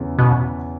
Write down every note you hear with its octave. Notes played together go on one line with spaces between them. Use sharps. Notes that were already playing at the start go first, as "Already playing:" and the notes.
Already playing: E2 C#3 E3
B2